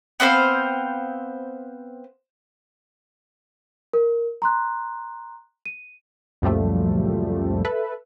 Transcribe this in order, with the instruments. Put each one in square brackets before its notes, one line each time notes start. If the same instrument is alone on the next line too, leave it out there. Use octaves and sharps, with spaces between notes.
[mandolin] B3 C4 C5 F5
[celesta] A#4
A#5 C6 F#6
D#7
[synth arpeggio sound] C#2 F#2 A#2 F3 G3 A3
A4 B4 E5